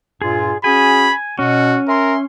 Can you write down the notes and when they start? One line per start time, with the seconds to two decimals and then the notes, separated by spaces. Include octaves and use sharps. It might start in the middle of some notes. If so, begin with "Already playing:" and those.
0.22 G2 A#2 F4 G#4
0.64 C#4 F#4 G#4 G#5 B5
1.39 B2 C#4 F#4
1.88 A#4 E5 G#5 C6